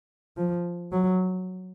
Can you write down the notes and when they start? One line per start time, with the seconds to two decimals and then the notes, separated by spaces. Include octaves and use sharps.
0.37 F3
0.92 F#3